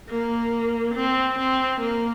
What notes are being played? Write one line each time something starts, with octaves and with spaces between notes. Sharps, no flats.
A#3
C4
C4
A#3